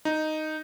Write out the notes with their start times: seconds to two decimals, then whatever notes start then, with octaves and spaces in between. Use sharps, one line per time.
0.05 D#4